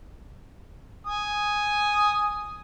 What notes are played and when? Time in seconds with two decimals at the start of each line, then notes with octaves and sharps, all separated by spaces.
1.07 G#5 D#6